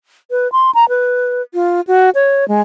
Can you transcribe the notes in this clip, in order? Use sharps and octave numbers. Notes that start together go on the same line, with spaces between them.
B4
C6
A#5
B4
F4
F#4
C#5
G#3